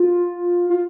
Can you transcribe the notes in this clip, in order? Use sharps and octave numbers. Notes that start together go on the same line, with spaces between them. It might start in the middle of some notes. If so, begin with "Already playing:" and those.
Already playing: F4
F4